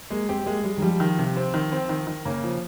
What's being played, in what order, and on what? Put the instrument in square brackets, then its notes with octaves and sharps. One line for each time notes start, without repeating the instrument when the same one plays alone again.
[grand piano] G#3 [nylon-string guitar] A#3
[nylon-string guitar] C4 [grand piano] G4
[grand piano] G#3 [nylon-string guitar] A#3
[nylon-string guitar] G3 [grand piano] G#3
[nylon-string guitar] D#3
[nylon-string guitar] F3 [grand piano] G3
[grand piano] D#3
C3
C4
D#3
C4
D#3
D#3
[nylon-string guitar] C#3 [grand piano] A#3
[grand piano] F3